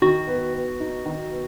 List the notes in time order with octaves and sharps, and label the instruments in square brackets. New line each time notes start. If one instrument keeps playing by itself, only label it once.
[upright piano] D#3 [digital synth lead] F#4
[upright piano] B3
B3
D#4
D#3
B3